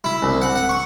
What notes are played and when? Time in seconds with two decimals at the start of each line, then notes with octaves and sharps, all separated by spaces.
0.04 E4
0.22 C2
0.42 F#5
0.56 F#5
0.69 C#6